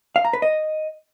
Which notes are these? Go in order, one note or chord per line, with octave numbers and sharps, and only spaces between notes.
F5
A#5
B4
D#5